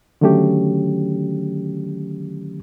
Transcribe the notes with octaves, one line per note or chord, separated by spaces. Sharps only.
D3 D#3 F#3 A3 C#4 G4